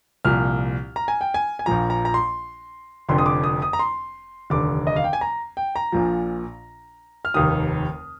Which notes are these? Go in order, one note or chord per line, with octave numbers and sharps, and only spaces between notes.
C2 A#2 F3 F6
A#5
G#5
G5
G#5
G#5
A#1 A#2 F3 A#5
A#5
A#5
C6
F1 F2 D3 C6
D#6
D6
D#6
D#6
A#5
C6
F1 D#2 D3 D6
D#5
F5
G5
G#5
A#5
G5
A#5
A#1 A#2 F3
F6
F1 D#2 D#3 D#6